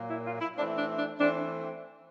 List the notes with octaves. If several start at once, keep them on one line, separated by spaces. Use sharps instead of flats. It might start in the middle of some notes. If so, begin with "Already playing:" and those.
Already playing: A#2 F#3 A#3
E4
F4
E4
E3 A3 C4 D4
D4
D4
E3 A3 C4 D4